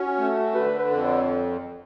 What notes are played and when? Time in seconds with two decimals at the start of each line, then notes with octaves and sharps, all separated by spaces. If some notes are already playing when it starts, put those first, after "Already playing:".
Already playing: C#4 F#4
0.18 A3
0.55 D3 B4
0.79 B4
0.91 F2
1.04 C#5